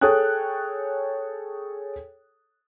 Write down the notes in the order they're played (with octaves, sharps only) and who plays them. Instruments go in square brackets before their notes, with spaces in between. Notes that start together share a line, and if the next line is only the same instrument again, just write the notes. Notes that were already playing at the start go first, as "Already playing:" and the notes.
[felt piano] G#4 A4 C#5 G5 D#6 F#6